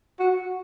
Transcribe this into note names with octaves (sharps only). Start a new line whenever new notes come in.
F#4